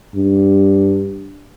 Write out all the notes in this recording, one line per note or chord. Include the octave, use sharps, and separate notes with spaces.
G2